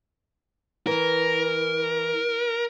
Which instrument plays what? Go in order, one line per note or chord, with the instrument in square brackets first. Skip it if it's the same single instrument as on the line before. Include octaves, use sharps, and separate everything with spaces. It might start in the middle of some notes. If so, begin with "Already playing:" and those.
[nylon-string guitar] E3 [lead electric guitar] A#4